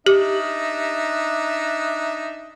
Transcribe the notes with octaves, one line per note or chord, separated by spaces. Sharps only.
D4 D#4 G4 E5